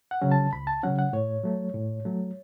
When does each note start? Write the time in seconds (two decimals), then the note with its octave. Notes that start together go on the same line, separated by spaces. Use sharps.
0.11 F#5
0.22 C#3 F#3 C#4
0.32 A5
0.53 C#2 B5
0.67 A5
0.83 C#3 F#3 C#4 F#5
0.99 F#5
1.13 A2 C#5
1.44 F#3 A3
1.74 A2
2.05 F#3 A3